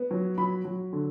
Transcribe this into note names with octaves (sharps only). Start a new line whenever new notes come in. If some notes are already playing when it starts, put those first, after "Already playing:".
Already playing: B3
F#3
F#3 B5
F#3
D3